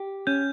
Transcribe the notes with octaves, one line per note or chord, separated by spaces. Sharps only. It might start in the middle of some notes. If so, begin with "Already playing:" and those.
Already playing: G4
C#4 G6